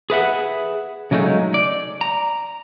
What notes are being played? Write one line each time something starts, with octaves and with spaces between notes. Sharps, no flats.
G#4 B4 E5 F#5
C#3 F#3 G#3 A3 D#4
D5
A#5